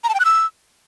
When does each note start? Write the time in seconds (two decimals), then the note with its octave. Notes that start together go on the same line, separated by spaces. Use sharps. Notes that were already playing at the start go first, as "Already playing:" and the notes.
0.04 A#5
0.09 A5
0.14 G5
0.20 F#6
0.25 E6